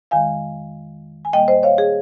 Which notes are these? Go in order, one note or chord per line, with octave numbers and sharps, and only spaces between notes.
F2 D#3 G#3 F5 G#5
G#5
A#2 G3 A#3 D#5 G5
C5 D#5
C#5 F5
G#4